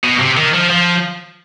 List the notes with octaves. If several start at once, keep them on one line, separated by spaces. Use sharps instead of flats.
B2
C3
D#3
F3
F3